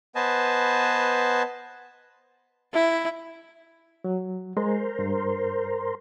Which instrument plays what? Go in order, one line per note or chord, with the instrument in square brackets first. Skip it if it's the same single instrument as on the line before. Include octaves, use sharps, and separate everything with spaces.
[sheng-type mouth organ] B3 B4 C5 D#5 G#5 A5
[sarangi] E4
[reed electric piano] F#3
[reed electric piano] G#3 [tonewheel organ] A#4 C5
[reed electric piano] G2